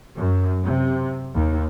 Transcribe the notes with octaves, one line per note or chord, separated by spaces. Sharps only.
F#2
C3
D#2